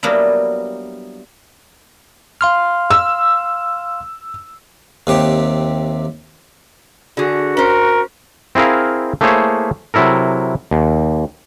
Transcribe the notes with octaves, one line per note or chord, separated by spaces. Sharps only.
F#3 G3 A#3 B3 D4 E4
F5 C6 F6
E6
D#2 C3 G4
D3 F#4 G#4
C#4 A#4 C5
C4 E4 G#4 A#4 F5
A3 A#3 E4 G#4 C5 C#5
C3 F#3 E4 A4 A#4
D#2